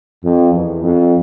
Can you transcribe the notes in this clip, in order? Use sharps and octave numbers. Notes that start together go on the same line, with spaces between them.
F2
E2
F2